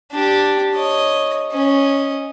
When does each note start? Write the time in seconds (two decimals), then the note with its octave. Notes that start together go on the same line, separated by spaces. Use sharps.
0.12 D4 G4
0.74 C#5 D#5
1.52 C#4 D#5